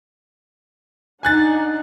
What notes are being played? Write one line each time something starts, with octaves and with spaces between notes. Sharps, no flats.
D4 D#4 F#5 G#5 F#6 A6